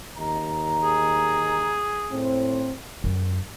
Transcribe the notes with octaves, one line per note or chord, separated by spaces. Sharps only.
D#2 D#5 A#5
G#4
A2 C4
F#2